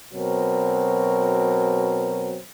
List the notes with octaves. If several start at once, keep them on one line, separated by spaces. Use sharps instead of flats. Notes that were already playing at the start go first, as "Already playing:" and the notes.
B2 F#3 C4 A#4